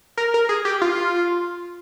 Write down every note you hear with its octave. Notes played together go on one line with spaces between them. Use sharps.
A#4
A#4
G#4
G4
F4